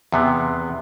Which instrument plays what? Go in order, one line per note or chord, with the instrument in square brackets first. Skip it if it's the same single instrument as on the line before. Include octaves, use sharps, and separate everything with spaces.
[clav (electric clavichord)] E2 C3 B3